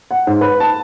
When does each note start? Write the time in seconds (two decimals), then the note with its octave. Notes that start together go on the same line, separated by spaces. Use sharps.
0.11 F#5
0.27 G#2
0.41 B4
0.60 A5